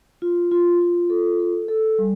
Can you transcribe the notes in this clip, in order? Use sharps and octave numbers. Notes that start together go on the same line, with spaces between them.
F4
F4
F4
A4
A4
A4
G3